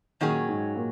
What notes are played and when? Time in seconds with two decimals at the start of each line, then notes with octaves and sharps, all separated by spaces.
0.21 A#2 D#3 F#3 C#4 G#4
0.48 G#2
0.76 A#2